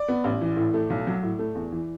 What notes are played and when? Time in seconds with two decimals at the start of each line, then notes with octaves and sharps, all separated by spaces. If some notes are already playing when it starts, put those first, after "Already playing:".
Already playing: D5
0.08 B3
0.24 A1
0.41 E3
0.57 A2
0.74 A3
0.90 B1
1.07 F#3
1.23 A2
1.39 A3
1.55 E2
1.72 E3